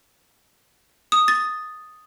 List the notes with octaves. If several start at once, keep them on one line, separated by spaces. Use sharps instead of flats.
D#6
A6